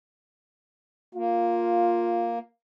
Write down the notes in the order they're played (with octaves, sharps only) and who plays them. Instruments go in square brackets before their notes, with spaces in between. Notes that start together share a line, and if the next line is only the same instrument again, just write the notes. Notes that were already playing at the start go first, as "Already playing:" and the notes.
[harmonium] A#3 [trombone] F4